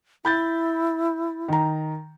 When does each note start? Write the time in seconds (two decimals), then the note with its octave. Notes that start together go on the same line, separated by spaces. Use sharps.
0.25 E4 B5 G6 A6
1.48 D#3 A#5